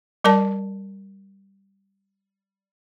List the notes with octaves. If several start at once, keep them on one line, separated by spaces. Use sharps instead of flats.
G3 A#4 D5 A5